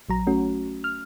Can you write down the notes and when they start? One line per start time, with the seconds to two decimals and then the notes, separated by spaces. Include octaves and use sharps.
0.09 A#1 F#3 A#5
0.27 A3 C#4 F#4
0.84 F6